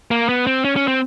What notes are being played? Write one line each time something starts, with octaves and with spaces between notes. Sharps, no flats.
A#3
B3
C4
C#4
C#4
C4